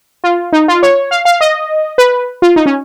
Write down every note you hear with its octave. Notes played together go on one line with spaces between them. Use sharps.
F4
D#4
F4
C#5
F5
F5
D#5
B4
F4
D#4
C#4